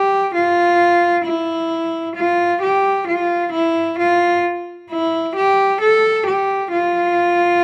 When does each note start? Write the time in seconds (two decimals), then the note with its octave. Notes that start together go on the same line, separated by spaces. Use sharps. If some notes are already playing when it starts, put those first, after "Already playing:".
Already playing: G4
0.35 F4
1.26 E4
2.16 F4
2.62 G4
3.08 F4
3.53 E4
3.99 F4
4.91 E4
5.36 G4
5.81 A4
6.27 G4
6.72 F4